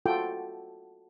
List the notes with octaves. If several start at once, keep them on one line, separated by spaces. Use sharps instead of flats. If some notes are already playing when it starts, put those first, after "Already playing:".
F4 F#4 A4 G5